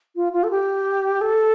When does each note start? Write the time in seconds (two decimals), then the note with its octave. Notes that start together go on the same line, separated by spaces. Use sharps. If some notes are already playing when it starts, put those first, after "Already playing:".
0.16 F4
0.32 F4
0.43 A4
0.51 G4
1.21 A4